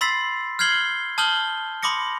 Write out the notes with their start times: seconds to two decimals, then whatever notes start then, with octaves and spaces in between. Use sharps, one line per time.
0.01 B5 C6 E6 A6 B6 C7
0.59 F6 G6 G#6 C7 F#7 G7
1.18 A5 D#6 F6 G6 F#7 G7
1.83 B5 C6 D6 D#6 A#6 C#7